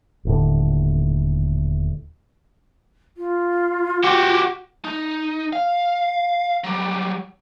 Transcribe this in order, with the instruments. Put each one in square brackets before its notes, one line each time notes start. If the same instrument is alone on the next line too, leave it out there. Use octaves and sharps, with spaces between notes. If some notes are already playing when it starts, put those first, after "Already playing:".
[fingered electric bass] D#1 A2 D3
[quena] F4
[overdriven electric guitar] F#4 G4
[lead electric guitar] D#4
F5
F#3 G3